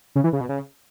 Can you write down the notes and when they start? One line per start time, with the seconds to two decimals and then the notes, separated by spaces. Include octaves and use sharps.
0.16 C#3
0.24 E3
0.33 C#3
0.41 B2
0.49 C#3